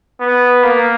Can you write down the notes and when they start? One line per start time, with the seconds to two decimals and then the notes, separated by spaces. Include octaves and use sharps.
0.20 B3
0.63 A#3